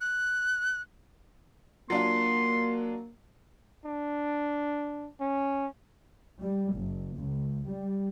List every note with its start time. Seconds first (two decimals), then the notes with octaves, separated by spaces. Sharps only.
0.01 F#6
1.90 F#3 A#3 D4 F4 C6
3.85 D4
5.20 C#4
6.39 G3
6.74 F#1
7.15 C#2
7.67 G3